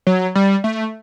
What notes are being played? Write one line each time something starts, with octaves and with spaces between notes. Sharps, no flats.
F#3
G3
A3